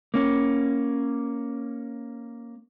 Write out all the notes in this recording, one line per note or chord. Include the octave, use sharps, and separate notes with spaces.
A#3 C#4